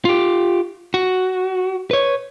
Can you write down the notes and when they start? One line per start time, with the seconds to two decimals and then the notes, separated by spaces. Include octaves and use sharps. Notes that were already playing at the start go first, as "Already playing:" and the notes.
0.05 F4 G4
0.94 F#4
1.91 B4 C#5